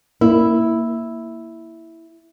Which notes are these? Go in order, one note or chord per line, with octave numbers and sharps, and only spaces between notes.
A#3 E4